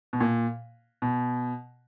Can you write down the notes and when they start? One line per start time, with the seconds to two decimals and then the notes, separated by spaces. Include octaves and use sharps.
0.13 B2
0.20 A#2
1.02 B2